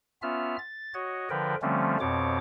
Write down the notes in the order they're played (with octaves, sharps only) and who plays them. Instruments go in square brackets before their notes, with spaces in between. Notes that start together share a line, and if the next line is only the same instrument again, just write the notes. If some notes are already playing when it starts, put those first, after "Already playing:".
[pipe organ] B3 C#4 F4 E5 F6
A6
F#4 C#5 D#5
D3 F3 A#4 B4 G5
D3 F3 G3 A3 C4 C#4
F2 B2 C4 C#5 D6